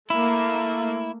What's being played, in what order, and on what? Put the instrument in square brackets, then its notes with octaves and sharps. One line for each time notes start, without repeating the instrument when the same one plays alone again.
[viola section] A3 A#3 [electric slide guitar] E4